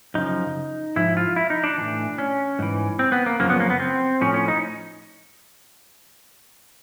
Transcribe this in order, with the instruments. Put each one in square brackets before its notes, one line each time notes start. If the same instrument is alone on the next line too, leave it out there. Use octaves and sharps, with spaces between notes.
[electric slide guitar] F#2 C#3 F3 D#4
G#2 F3 E4
F4
E4
D#4
D4
A2 E3
C#4
G#2 E3
C4
B3
A#3
F#2 C#3 F3 A#3
B3
A#3
B3
C4
A2 F3 C#4
C#4
D#4